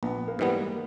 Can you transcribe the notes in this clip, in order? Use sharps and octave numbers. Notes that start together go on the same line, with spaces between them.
A#1 B3
A#3
G#2 E3 G3 B3
A#3